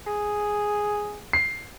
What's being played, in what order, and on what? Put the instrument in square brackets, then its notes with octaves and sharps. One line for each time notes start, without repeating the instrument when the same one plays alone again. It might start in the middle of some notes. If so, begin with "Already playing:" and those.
[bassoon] G#4
[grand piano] C7